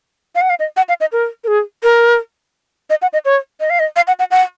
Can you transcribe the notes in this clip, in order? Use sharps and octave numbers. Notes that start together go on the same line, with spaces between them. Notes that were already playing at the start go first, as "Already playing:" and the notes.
F5
F#5
F5
D#5
F#5
F5
D#5
A#4
A#4
G#4
A#4
D#5
F#5
D#5
C#5
D#5
F5
D#5
F5
F#5
F#5
F#5